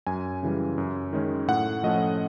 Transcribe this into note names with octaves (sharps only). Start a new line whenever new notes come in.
F#2 G#5
C#3 E3 G3
F#2
D#3 G#3 C#4
A2 F#5
F3 A3 C#4 D#5